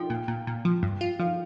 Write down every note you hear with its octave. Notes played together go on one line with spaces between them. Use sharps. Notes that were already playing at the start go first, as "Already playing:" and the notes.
Already playing: F3 G5
A#2
A#2
A#2
F3
G2
F4
F3 F5